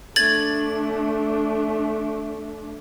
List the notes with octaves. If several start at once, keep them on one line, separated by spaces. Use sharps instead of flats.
A3 D4 G#6 A6 F#7